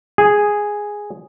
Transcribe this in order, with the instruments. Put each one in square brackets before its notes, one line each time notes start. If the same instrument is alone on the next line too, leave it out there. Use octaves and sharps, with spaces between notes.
[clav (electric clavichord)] G#4